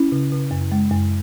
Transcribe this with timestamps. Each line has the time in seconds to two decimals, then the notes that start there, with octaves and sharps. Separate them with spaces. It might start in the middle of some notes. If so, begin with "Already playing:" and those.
Already playing: C#4 E4
0.12 C#3
0.32 C#3
0.51 F#2
0.71 G#3
0.91 F#2